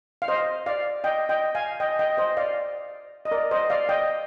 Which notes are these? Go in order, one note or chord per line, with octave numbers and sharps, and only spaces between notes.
F5
C5 D#5
D5 F5
D#5 G5
D#5 G5
F5 G#5
D#5 G5
D#5 G5
C5 D#5
D5 F5
D#5
A#4 D5
C5 D#5
D5 F5
D#5 G5